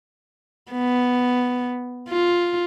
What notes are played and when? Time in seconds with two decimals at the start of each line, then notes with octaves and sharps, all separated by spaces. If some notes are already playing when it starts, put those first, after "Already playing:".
0.72 B3
2.09 F4